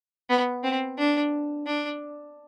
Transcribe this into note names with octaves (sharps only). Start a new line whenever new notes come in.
B3
C4
D4
D4